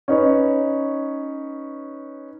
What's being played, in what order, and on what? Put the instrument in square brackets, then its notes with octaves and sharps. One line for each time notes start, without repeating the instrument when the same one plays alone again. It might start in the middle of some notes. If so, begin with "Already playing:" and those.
[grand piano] C#4 D#4 B4 C#5